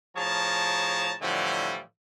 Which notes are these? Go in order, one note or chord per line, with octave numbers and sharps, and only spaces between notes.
A2 F3 G#4 C#5 A5 A#5
A2 D3 E3 F3 G3